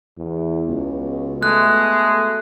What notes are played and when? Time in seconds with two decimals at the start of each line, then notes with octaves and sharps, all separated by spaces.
0.17 E2
0.68 C#2 B2
1.43 G#3 A3 F#6